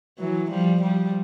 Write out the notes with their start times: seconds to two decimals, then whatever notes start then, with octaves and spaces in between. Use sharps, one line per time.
0.19 E3 F#3
0.50 F3 G3
0.81 F3 G3